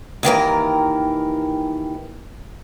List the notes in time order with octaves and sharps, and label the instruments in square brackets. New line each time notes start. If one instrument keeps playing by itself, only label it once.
[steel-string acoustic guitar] D#2 D#3 E3 A#4